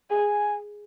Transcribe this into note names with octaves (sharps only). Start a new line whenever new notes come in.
G#4 G#5